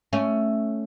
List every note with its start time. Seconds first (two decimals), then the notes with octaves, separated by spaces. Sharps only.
0.13 A3 C#4